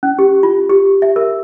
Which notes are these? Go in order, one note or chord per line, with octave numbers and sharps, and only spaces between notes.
C#4
G4
F4
G4
E5
A#4